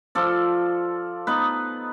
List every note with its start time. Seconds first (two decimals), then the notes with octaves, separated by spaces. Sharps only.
0.15 F3 A4 D5
1.27 B3 D#4 B4